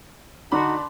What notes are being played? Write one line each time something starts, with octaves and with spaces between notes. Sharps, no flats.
D3 D4 D#4 F#4 A5 B5 C6 D6